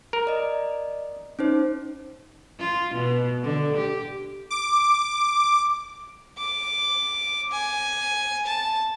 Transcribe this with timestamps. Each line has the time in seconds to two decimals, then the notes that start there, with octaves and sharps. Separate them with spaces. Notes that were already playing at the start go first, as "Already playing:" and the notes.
0.13 A#4
0.27 D5 D#5
1.39 C#4 D#4 C5
2.60 F4
2.95 B2
3.43 D3
3.77 G4
4.50 D6
6.38 D6
7.52 G#5
8.46 A5